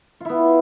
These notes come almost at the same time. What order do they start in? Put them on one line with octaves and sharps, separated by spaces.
F4 E4 B3